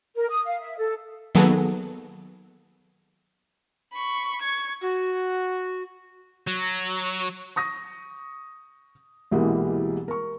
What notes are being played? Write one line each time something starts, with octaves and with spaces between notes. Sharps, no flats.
A#4
D#6
F5
E5
A4
D#3 F#3 A#3 B3 G#4 A4
B5 C#6
C#6 G#6
F#4
F#3
C#6 D#6 A#6
C2 B2 E3 G3 G#3 A#3
A#4 C#6